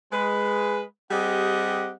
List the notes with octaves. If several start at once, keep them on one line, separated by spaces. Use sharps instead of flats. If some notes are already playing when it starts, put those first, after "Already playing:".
G#3 B4
G3 C4 G4 G#4 D#5 F#5